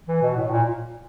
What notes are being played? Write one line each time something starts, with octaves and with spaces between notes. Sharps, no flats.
E3
B2
A2
A#2